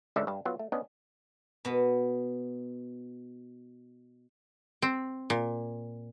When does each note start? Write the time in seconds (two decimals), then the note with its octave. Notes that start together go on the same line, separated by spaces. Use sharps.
0.16 G#1 C#2 D3 A4 D5 E5
0.27 G2 D4 A5
0.45 F#3 B3 F4
0.59 A3
0.72 B3 C#4 D4 D#5
1.65 B2 B3
4.82 C4
5.30 A#2